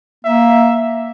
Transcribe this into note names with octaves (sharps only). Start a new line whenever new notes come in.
A#3 E5